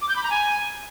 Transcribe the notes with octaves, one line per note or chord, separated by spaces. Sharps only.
D6
G6
B5
A#5
G#5